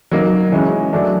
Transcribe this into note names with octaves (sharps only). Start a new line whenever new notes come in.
F#3 A#3 D#4
C#3 E3 G#3 C#4
F#3 A3 D4